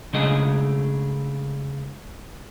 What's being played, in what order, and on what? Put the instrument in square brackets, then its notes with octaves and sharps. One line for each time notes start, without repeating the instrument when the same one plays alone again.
[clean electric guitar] C#3 G#3 A3 D4 D#5